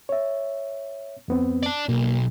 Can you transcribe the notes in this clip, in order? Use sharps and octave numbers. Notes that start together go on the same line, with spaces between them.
C#5 E5
F2 B3 C4
D5 A5
B1 A#3